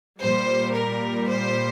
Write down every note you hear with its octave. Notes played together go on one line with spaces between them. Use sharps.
A#2 G3 C5
A#4
C5